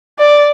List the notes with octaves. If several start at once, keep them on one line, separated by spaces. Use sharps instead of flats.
D5